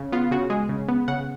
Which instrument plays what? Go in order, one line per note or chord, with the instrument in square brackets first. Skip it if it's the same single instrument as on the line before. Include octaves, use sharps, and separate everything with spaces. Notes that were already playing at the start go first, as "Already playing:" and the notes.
Already playing: [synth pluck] C#3
B3 F4
C#3 F#4
G#3 G#4
C#3
B3
C#3 F#5